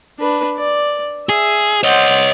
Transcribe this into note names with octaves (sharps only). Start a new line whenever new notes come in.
D4 B4
D5
G#4 E5
C5 C#5 D#5 F#5